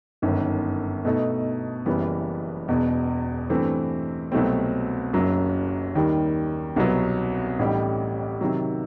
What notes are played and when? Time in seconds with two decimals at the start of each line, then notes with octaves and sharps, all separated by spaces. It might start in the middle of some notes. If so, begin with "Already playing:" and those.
0.22 G1 F#2 D#3
1.05 B2 A3 D#4 A4
1.86 F#1 F#2 E3 G3 B3
2.68 E1 E2 B2
3.50 G2 E3 A3 C4
4.32 C2 B2 F#3 A3 C4
5.13 F#1 F#2 F#3
5.95 D#2 D#3 G3
6.76 C2 B2 F#3 B3
7.59 A1 A2 G3 D#4 G4
8.41 C3 D#3 F#3